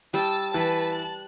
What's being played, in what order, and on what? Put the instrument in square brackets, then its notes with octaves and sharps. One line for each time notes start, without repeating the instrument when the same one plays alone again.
[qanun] G3 [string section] A5 [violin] E6
[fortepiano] E3 [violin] B4
[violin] F#6